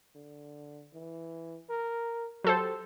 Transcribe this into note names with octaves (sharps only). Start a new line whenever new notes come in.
D3
E3
A#4
F#3 G4 A4 C5